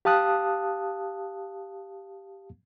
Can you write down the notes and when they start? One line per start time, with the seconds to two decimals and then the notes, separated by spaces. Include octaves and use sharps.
0.05 G4 F5 A5 D#6 F#6